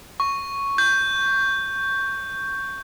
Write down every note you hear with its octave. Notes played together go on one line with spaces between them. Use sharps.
C#6
G6